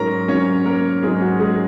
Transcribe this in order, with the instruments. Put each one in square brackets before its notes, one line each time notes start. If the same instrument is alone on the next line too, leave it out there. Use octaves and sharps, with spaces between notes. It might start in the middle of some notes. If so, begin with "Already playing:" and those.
Already playing: [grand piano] G#2 F#3 C#4 A#4 A#5 C#6
G#2 F#3 C#4 C#5
A#3 A#4
G#2 F#3 G#3 C#4 G#4
F#4
G#3 G#4